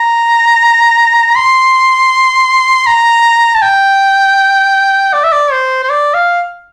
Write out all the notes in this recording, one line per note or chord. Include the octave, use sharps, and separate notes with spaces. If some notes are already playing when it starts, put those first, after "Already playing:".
Already playing: A#5
C6
A#5
A5
G5
D5
E5
D5
C5
C5
D5
F5